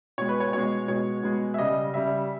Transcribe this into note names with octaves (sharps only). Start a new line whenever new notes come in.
B2 G#3 C#5
B4
C#5
B2 G#3 C#5
B2 G#3 C#5
B2 G#3
E5
C#3 G3 D#5
C#3 G3 E5